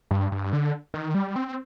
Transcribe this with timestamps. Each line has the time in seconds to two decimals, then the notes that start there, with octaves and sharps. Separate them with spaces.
0.11 G2
0.32 G2
0.53 D3
0.94 D#3
1.14 G3
1.36 C4